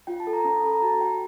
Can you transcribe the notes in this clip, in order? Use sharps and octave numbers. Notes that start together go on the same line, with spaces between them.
F4 G5
A5
A4
A#5
C#4 A5
A4 B5
A#5
F#4 A5
F#4 G5